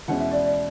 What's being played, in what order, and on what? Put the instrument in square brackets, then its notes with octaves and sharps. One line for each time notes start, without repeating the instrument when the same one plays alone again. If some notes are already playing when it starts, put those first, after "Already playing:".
[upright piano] E2 B2 G#3 C#4 E4 [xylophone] F#5
[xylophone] E5
D5
D5